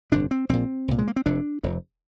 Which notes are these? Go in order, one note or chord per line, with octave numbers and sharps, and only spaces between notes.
G1 F2 C3 D4
C4
A#1 A#2 C4
C2 A#2
G#3
A#3
C4
F1 F2 C3 D4
F1 F2 C3